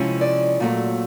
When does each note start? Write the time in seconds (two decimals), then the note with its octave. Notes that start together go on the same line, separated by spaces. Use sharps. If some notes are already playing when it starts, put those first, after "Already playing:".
Already playing: C3 F3 G#3 C#4 E4
0.21 D5
0.60 A#2 F#3 A3